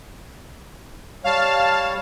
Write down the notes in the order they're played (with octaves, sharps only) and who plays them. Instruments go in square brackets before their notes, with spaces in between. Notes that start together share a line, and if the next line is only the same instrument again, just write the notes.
[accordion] G3 C#5 [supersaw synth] F5 A5